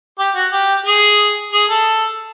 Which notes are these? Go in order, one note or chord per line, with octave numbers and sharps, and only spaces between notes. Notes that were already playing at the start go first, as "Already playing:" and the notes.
G4
F#4
G4
G#4
G#4
A4